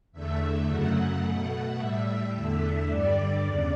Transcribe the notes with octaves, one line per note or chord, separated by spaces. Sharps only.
E2 D3 A3 E5
F#2 C#3 F#3 A3 F#5
B2 A3
A2 G3 E5
E2 D3 A3
G2 D3 G3 D5
E2 C#3